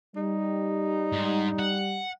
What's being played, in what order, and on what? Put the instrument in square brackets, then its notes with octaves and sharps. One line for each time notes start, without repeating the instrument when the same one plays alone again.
[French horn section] G3 [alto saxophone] D#4
[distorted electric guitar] G#2
F#5